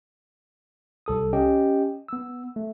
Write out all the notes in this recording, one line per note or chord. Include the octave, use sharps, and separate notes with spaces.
C2 A4 D#6
C#4 G4 D#5 G5
B3 E6
A3